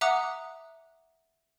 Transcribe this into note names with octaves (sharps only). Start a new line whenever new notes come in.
E5 F#5 A#5 D6 D#6 F#6